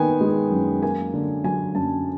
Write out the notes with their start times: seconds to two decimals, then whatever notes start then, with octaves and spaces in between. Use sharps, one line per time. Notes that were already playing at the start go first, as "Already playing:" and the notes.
Already playing: D#3 B3 G5 G#5
0.21 G#3
0.52 F#2
0.82 A#3 G#5
1.14 D3
1.44 F#3 G#5
1.75 F#2 A5